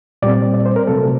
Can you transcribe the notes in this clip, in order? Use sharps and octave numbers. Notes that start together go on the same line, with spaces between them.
A#2 G3 C4 D5
D5
C5
A#4
C3 F#3 A3 C4 A4